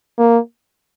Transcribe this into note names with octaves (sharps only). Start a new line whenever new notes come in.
A#3